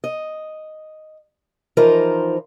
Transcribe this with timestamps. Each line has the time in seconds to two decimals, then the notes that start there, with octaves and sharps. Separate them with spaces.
0.04 D#5
1.77 E3 F3 D#4 F4 A#4 C5